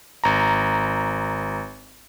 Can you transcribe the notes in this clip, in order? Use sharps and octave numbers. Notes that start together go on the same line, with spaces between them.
G#1 A#5